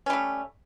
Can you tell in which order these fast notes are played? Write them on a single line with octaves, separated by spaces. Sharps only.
C#4 G3 A3